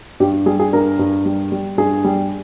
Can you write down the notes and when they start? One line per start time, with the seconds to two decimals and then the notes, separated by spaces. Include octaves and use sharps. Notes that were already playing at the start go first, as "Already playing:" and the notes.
0.20 G2 G4
0.46 G3 G#4
0.60 G#4
0.73 G2 A#4
0.99 G2
1.25 G3
1.52 G3
1.78 G2 G#4
2.04 G3